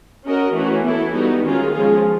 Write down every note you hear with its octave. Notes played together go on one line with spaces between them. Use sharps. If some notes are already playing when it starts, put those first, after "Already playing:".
C#4 F#4 A#4 D#5
E3 A3 C#4 F#4
B3 E4 A4
G3 B3 D#4 F#4
D#3 G#3 C#4 F4 G#4
F3 G#3 C#4 F4 G#4